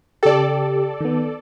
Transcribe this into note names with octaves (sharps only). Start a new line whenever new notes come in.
C#3 G4 A4 D5
D#3 B3